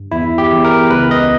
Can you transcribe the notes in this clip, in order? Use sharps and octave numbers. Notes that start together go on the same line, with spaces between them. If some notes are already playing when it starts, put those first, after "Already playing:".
Already playing: G2
E2 E4
G4
E2
A#4
C#2 B4
D#5